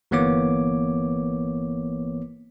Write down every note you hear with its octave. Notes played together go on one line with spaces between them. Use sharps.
G1 E3 A#3 B3 C#5 D6